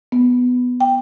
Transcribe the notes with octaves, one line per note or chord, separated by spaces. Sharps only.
B3
G5